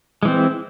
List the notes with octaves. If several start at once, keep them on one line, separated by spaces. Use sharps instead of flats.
E3 G#3 C4